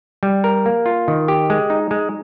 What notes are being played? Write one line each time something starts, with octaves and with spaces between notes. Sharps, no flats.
G3
A#4
A#3
F4
D#3
G4
G#3
D#4
G#3